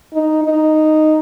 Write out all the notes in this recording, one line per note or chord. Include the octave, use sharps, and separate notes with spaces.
D#4
D#4